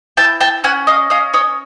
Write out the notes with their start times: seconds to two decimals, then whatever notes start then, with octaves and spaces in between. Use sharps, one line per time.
0.17 E4 G5 A5
0.40 G5 A5
0.64 C#4 F#5 G#5
0.87 D#5 F5
1.10 C#4 D#5 F5
1.34 C#5 D#5